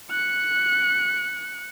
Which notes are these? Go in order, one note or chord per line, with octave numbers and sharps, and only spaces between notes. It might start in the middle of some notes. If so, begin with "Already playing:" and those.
F#6 C#7